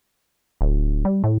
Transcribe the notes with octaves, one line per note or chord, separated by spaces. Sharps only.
D1
G3
A2